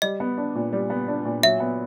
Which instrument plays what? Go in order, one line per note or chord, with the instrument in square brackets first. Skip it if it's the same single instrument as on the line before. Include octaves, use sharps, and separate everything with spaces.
[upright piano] G3 [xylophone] D#5
[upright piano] B3
D4
A#2
G3
B3
D4
A#2
[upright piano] F#3 [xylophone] E5
[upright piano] B3